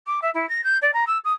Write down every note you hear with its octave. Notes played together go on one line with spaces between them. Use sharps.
D6
E5
E4
A#6
G6
D5
A#5
E6
D#6